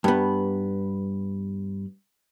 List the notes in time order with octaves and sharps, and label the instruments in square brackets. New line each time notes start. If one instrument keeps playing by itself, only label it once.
[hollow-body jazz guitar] G2 B3